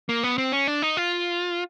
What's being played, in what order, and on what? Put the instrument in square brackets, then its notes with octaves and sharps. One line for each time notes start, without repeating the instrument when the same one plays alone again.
[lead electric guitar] A#3
B3
C4
C#4
D4
D#4
F4